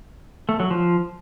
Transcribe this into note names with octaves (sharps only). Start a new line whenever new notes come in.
A3
F#3
F3